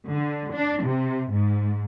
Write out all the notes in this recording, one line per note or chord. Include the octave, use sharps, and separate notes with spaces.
D3
D4
C3
G#2